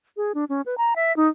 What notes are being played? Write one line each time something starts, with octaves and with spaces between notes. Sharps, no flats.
G#4
D4
C#4
B4
A#5
E5
D#4